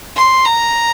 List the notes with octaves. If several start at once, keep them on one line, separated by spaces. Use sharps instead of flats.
C6
A#5